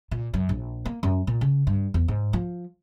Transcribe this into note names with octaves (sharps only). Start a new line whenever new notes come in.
A#2
F#2
A#1
A#3
F#2
A#2
C#3
G2
E2
G#2
F3